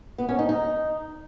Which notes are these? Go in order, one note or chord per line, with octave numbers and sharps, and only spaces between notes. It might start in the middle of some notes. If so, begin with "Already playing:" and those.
B3
C#4
D#4
D#4